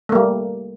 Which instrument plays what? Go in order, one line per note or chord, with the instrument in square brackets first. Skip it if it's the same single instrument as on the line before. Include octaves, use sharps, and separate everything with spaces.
[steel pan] A3
A#3
G3